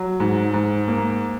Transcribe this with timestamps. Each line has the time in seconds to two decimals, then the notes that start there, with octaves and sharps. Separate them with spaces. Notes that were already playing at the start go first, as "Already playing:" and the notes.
Already playing: F#3
0.20 G#2
0.54 G#2
0.88 A#3